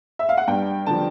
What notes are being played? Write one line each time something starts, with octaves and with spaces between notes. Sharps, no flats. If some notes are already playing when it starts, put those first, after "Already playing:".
E5
F5
F#5
G2 G5
D3 F3 A5